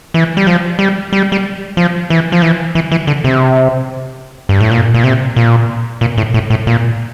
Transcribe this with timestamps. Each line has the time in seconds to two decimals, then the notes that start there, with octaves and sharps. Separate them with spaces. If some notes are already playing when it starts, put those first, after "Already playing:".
0.14 E3
0.37 G3
0.47 F3
0.79 G3
1.13 G3
1.32 G3
1.77 F3
2.10 E3
2.32 F3
2.42 E3
2.75 E3
2.92 E3
3.07 D3
3.24 C3
4.49 G2
4.61 A2
4.71 A#2
4.94 A#2
5.04 C3
5.36 A#2
6.01 A#2
6.18 A2
6.34 A2
6.50 A2
6.67 A#2